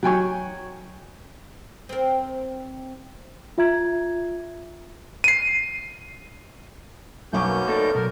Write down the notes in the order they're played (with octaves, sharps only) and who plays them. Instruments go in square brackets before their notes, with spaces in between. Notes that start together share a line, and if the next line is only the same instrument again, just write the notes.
[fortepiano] F#3 G5 G#5 C#6
[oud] C4 A#4
[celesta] F4 E5 A#5 G#6
[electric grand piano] C7 D#7
[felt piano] B1 C#6 D6 [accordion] F#2 B3 G6 [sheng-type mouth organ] A#3 C#4
[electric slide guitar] A3 D#4 D5 [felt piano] A4
[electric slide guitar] B2 F#3 [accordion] A#4